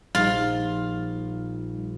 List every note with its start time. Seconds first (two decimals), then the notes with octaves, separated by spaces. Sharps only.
0.15 A#1 G3 D#4 F4